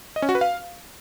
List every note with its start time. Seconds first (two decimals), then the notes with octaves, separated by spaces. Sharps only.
0.16 D#5
0.22 C#4
0.29 F#4
0.35 B4
0.41 F5